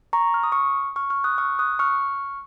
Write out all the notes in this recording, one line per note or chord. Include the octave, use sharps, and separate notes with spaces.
A#5 C#6
F6
D#6
C#6 F6
C#6 F6
C#6 F6
D#6 F#6
C#6 F6
D#6 F#6
C#6 F6